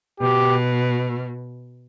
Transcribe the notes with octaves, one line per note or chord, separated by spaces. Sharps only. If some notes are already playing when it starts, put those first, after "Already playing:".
B2 G4